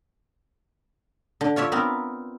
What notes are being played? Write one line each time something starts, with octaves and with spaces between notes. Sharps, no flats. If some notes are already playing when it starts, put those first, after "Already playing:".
D3
F4 C#5 D5 E5
B3 C4 A#4